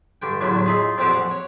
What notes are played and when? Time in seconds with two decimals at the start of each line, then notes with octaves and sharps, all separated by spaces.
0.22 G2 D3 G5
0.41 A1 E2 D3 F#3 A3
0.65 D#4 F4 G#4 D#5 E5
0.98 A#1 F2 C4 F#4 G4
1.13 F#5
1.31 C#5